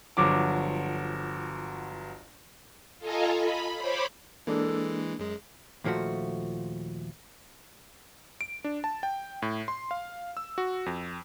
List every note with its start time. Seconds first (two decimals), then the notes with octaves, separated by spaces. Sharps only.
0.17 G1 F3 F#3 D6
2.99 F4 A4 D#5 G#5 A#5
3.35 B5
3.77 C5 C#5 B5 D6
4.47 E3 G#3 A#3 D4 A4
5.19 F#2 G#3 G#4
5.84 D#2 A#2 F3 A3 F#4
8.41 D7
8.64 D4
8.84 A5
9.03 G5
9.42 A2
9.68 C6
9.91 F5
10.37 E6
10.58 F#4
10.86 F2